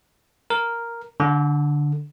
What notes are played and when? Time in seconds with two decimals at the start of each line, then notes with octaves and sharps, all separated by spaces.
0.50 A#4
1.20 D3